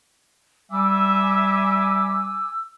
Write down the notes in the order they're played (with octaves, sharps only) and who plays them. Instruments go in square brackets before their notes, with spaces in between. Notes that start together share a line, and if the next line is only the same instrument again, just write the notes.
[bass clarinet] G3 [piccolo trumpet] E5 [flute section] G#5 D6 [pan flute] E6